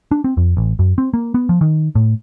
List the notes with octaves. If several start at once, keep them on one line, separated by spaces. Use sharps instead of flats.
D4
C4
F2
A1
F#2
C4
A#3
B3
F3
D#3
A2